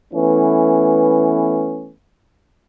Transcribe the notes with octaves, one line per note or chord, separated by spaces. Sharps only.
E3 A3 B3 C#4